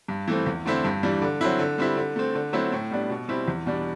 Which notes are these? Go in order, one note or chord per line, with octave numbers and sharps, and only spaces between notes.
G2
E3 A3 C4
E2
D3 A3 C4 E4
G2
E3 G3 D4
D3
F#3 C4 E4
D3
G3 C4 E4
D3
A3 C4
D3
F#3 A3 C4 E4
A2
G3 B3 D4
B2
G3 C4 E4
E2
B2 G3 D4